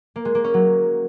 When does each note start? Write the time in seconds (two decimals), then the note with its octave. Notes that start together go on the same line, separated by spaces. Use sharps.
0.16 A#3
0.25 G#3
0.35 A#3
0.44 C#4
0.54 F#3